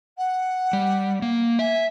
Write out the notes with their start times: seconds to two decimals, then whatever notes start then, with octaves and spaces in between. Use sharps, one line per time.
0.17 F#5
0.73 G3
1.22 A#3
1.59 E5 G#5